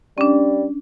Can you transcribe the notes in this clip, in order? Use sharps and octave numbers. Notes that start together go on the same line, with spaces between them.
G3 C#4 D4